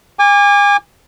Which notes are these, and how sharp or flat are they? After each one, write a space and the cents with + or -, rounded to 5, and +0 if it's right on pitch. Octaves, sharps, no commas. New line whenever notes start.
G#5 -35 D6 +0